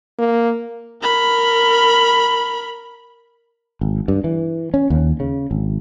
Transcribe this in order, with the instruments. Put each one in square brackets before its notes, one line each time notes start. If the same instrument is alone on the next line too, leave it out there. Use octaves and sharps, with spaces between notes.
[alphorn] A#3
[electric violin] A#4 B5
[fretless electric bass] G#1
G2
E3
C#4
D#2
C#3
G#1